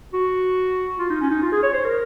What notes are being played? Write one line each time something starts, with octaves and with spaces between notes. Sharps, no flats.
F#4
F4
D#4
C#4
D#4
F4
G#4
C#5
C5
A#4